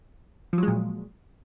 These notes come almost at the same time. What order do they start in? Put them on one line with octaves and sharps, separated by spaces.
F3 F#3 G#3 A#2